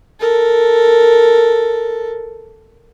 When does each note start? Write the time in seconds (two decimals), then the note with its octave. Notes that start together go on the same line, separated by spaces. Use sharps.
0.20 A4 A#4